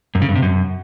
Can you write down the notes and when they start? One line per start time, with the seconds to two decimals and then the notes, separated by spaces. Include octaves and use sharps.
0.15 F#2
0.22 C#3
0.29 G2
0.35 C3
0.42 F#2